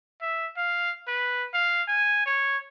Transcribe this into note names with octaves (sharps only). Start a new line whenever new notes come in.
E5
F5
B4
F5
G#5
C#5